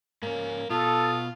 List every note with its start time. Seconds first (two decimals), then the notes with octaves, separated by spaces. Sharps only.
0.22 G#2 A#3 C#4
0.70 B2 F4 A4 D#6